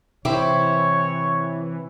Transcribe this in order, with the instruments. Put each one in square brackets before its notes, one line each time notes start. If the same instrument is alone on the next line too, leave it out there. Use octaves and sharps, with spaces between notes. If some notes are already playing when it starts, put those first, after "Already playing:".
[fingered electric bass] C3 [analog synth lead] E3 [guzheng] E4 G4 C5 [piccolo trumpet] C#5